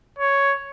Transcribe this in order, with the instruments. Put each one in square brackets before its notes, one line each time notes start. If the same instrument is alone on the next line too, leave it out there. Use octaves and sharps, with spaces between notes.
[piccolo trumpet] C#5